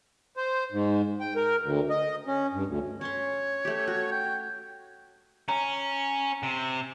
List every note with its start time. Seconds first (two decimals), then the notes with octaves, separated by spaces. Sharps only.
0.37 C5
0.72 G#2
1.20 G5
1.36 A#4
1.62 D2
1.90 D#5
2.27 C#4
2.53 G2
2.67 D2
3.01 C#4 C#5 C6
3.65 A3 G4
3.87 F#4
4.11 G5
5.49 C#4 A#5
6.43 C3